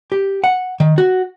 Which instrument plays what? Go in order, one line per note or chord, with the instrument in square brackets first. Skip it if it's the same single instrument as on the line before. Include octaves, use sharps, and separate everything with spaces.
[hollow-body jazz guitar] G4
F#5
D#3
F#4